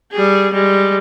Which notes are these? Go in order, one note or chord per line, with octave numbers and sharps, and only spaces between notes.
G3 G#4
G3 G#3